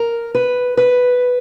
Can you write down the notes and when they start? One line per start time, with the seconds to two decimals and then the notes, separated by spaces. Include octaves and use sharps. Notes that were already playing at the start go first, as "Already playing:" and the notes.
Already playing: A#4
0.35 B4
0.77 B4